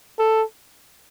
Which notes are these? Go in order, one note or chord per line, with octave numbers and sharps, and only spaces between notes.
A4